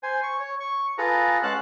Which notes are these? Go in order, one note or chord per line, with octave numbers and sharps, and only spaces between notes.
C5 G#5
C#6
C#5
C#6
F4 G#4 A4 B4 A#5
G#3 C#4 F5 F#5 A5 F#6